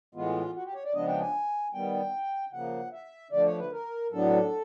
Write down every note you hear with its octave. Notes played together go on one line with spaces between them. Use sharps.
A2 E3 G#3 B3 F4
F#4
G4
C#5
D5
C#3 F3 G#3 B3 D4 D#5
G5
G#5
D#3 G3 B3 G5
C#3 F3 A#3 F#5
E5
D3 F3 A3 D5
C#5
B4
A#4
A2 F#3 B3 D4 A4